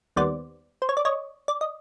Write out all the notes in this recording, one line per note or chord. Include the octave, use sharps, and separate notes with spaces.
D#2 D#3 G3 B3 C5 D5
C5
C#5
D5
C#5 D#5
D5
D#5